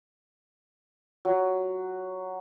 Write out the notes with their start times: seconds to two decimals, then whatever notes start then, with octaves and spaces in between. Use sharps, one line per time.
1.25 F#3